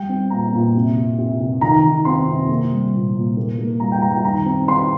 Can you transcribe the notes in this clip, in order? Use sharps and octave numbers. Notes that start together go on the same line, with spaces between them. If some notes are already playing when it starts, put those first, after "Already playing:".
Already playing: G3 G5
C4
A#2 A#5
A#2
C3
C3
C3
C3
D#3 A#5
D#3
C4 C6
C3
A#3
G3
A#2
A#2
A#3
A#3
G3 A#5
G5
G3 A#5
G5
D#3 A#5
C4
C4 C6